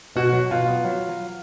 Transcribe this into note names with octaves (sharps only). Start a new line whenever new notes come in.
B2 F#4
F#3
B2 F4
B3
F#3